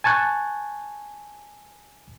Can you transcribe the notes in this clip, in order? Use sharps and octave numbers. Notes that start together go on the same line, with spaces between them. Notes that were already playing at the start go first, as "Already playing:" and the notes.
G#5 A5 C#6 F#6 G6